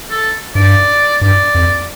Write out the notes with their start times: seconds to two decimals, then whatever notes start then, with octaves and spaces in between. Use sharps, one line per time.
0.10 A4
0.55 G2 D5
1.21 G2 D5
1.55 F2